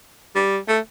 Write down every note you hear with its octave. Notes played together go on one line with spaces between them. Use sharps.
G3
A3